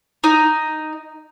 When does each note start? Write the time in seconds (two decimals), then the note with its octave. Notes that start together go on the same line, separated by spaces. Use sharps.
0.24 D#4